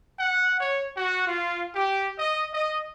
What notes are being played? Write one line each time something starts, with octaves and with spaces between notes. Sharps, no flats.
F#5
C#5
F#4
F4
G4
D#5
D#5